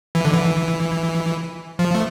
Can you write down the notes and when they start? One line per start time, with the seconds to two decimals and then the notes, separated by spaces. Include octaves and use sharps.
0.15 E3
0.25 D3
0.33 E3
1.79 F3
1.95 A3